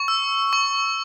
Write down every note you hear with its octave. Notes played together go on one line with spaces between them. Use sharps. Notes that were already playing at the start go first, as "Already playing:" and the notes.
Already playing: C#6
E6
C#6